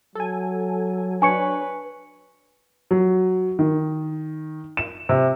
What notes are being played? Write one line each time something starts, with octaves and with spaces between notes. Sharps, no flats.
F#3 A4 G#5
D4 B4 C#5 G#5 C#6 C#7
F#3
D#3
E7
C3